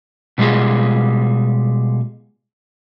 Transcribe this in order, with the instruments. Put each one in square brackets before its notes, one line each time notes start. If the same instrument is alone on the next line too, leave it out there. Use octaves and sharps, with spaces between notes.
[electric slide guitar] B2 G3 G#3 F4 G#4